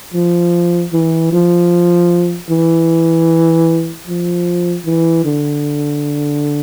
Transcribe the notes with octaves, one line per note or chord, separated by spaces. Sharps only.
F3
E3
F3
E3
F3
E3
D3